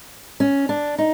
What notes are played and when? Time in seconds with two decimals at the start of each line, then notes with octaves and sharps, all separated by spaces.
0.40 C#4
0.69 D4
0.98 D#4